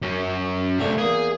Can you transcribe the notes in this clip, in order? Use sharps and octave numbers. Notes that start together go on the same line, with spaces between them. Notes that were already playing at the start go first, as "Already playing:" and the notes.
F#2 C#4
D2 C3 A3 D4
E2 A#3 G#4